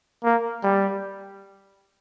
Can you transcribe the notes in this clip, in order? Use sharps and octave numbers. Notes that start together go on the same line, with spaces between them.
A#3
G3